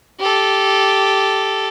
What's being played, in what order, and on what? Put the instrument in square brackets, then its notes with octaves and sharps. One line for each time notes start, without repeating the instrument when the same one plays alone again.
[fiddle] G4 A4